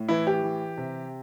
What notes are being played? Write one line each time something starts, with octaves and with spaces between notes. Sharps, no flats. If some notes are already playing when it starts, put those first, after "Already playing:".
Already playing: A2
E3 E4
G4
E3
C3